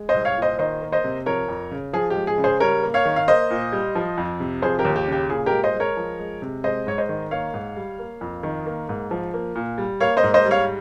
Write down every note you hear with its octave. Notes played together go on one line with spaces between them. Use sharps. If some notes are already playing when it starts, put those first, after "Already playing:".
Already playing: G#3
C5 D#5
C2
C#5 F5
A#2
C5 D#5
D#3 C5 D#5
A#3
C5 D#5
C3
F3 A#4 C#5
F2
C#3
F3 G#4
G4
G#3
G#4
C#3
G#4 C5
G3 A#4 C#5
A#3
C#5 F5
D#3
F5
A#3 C5 D#5
A#2
G3
F3
F2
C3
F3 G#4 C5
G4 A#4
D#2
G4
C#3
G4
A#2 G#4
G4 A#4
G#3
C5 D#5
G#3
A#4 C#5
F3
G#3
C3
G#3 C5 D#5
G#2 C#5
C5 D#5
D#3
A#3 C#5 F5
G#2
G3
A#3
F2
D#3
A#3
G#2
F3
A#3
A#2
G3
A#3 C#5 F5
C5 D#5
G#2
C5 D#5
G3
C#5 F5